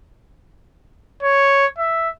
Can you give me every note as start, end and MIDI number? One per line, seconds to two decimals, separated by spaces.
1.23 1.66 73
1.78 2.10 76